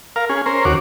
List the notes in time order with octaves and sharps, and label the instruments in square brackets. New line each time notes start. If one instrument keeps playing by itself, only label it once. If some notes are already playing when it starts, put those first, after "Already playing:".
[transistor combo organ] A#4 F5
C#4 G#4
C#4 A#4 C5
D#2 F#4 C#5 D6